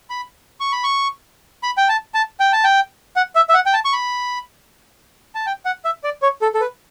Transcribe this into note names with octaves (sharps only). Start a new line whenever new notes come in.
B5
C#6
B5
C#6
B5
G5
A5
A5
G5
A5
G5
F#5
E5
E5
F#5
G5
A5
C#6
B5
A5
G5
F#5
E5
D5
C#5
A4
A4
B4